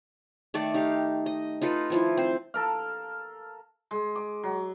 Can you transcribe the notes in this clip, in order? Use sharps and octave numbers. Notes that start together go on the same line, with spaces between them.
D#3 A3 D5
D#4 G4 F5
D#5
D#4 F4 A4 B4
D#3 F3 E4
C4 C5
A4 A#4 F5
G#3
D6
F#3